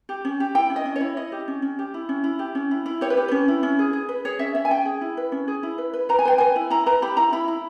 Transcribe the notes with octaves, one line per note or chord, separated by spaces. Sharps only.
G4
C#4
G4
E4 G5
C#4
D#5
C#4
E4 C#5
E4 D#5
G4
C#4
C#4
G4
E4
C#4
E4
G4
C#4
E4
E4
G4 C#5
B4
G4
C#4 B4
E4
C#4
G#4
G#4
B4
G#4 C#5
C#4 E5
C#4 E5
G#5
C#4 G5
G#4
E4
B4
C#4
G#4
E4
B4
B4
B4 A#5
G#5
B4 G5
B4 G#5
E4
E4 A#5
B4 A#5
G4 B5
E4 A#5
E4 B5
E4